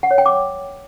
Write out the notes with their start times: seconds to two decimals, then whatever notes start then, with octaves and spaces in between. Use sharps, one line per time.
0.03 F#5
0.11 C#5
0.18 G5
0.26 D6